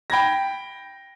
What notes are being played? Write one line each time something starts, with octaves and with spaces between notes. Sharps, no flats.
G5 B5 G#6 A#6